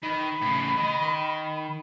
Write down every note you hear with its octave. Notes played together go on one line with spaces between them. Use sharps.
D#3 B5
A2 C#3
D#3